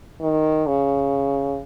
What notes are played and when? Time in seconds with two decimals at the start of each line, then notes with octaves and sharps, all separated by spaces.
0.21 D#3
0.67 C#3